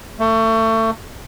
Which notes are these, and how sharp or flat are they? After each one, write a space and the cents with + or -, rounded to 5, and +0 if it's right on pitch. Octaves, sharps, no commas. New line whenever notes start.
A3 +30